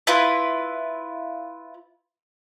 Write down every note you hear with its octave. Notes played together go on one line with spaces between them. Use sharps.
E4 F4 B4